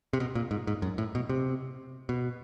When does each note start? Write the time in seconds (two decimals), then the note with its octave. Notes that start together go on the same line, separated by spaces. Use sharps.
0.13 C3
0.20 B2
0.35 A#2
0.51 G#2
0.67 G#2
0.82 F#2
0.98 A2
1.15 B2
1.29 C3
2.09 B2